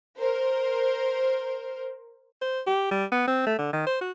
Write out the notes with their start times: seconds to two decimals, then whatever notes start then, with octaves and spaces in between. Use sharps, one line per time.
0.19 A#4 C5
2.42 C5
2.67 G4
2.91 G3
3.12 B3
3.28 C4
3.46 A3
3.59 D3
3.73 D#3
3.87 C5
4.01 F#4